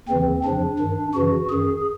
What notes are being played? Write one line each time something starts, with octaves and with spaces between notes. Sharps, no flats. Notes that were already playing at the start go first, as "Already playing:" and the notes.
D#2 C#3 E3 C4
F2 C#3 F3 D4
G2 D#3
F#2 C#3 E3 F#4
F#2 D#3 G#4